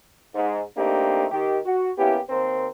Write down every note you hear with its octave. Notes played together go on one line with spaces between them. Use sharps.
G#2
A3 A#3 C4 D4 D#4 G4
D#3 G4
F#4
A#3 B3 C#4 E4 G4
D#2 C4 A#4 C5